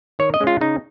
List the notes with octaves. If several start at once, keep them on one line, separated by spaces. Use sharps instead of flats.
D#3 C#5
D#5
G#3 C#4
F4
C#3 D#4